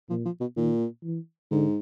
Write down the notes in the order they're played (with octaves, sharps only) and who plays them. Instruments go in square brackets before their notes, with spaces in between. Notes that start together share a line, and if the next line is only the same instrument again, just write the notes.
[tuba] A#2 [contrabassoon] F3
[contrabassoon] F3
B2
[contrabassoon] A#2 [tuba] D#3
[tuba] E3
[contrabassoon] G#2 [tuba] D3